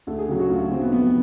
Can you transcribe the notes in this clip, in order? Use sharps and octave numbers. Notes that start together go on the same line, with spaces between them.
D2 A4
G#4
C#3 F#3 G4
F#4
D2 F4
F4
C#3 F#3 C4
B3
F1 B3